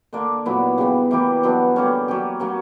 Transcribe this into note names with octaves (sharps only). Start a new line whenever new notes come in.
D3 A#3 D4
A#2 F#3 B3 E4
C#3 G3 B3
E3 A#3 E4 G4
G2 F#3 B3 D4
D3 G3 A#3 C#4
F#3 C#4 G4
F#3 A#3 C#4